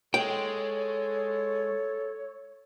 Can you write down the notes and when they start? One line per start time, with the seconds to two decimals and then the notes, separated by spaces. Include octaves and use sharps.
0.14 G#3 A4 C#5 G5